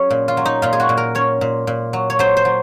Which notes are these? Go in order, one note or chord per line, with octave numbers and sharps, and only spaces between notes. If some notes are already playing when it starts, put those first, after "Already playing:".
Already playing: F#3 C#4 G#4
A#2
F4
F#3
D#4
A#2 F4
G#4
F#4
A#2
A#4
C#4 C#5
A#2
A#2
F#3
C#5
F#3 C5
C5
F#3